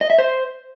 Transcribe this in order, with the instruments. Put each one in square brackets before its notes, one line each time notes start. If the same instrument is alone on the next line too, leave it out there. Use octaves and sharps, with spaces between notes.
[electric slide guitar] D#5
E5
C5